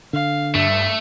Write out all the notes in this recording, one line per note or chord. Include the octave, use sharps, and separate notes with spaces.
D3 F5
G2 A3 E5